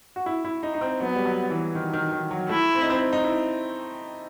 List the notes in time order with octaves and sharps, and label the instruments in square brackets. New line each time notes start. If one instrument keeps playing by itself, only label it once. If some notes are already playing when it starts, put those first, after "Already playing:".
[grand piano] F#4
E4
E4
D#4
D#4
C4
[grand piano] F#3 [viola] B3
[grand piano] G3
F#3
E3
D#3
D#3
D#3
F#3
[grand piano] A3 [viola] E4
[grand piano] C4
D#4
C4
D#4
E4